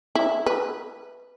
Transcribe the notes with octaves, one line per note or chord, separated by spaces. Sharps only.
E4
B4